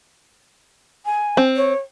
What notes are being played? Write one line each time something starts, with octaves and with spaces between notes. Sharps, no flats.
G#5
C4
C#5